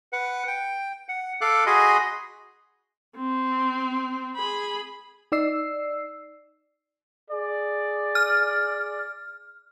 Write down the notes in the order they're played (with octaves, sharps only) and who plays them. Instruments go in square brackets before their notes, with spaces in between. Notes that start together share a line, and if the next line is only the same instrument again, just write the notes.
[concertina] B4 F#5
G5
F#5
A4 F5 D6 F#6
F#4 G#4 D#5 G#5 B5 C6
[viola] C4
G#4 B5
[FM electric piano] D#4 D5 E6 C7
[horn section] G#4 D5
[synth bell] F6